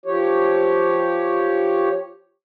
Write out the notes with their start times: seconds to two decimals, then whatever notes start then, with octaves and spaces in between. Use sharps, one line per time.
0.06 F3 G4 C#5